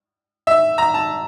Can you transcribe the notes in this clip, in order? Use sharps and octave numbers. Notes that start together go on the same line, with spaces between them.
E5
A#5
A5